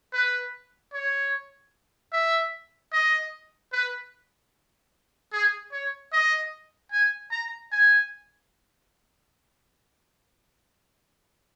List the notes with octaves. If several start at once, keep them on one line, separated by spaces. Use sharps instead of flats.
B4
C#5
E5
D#5
B4
G#4
C#5
D#5
G#5
A#5
G#5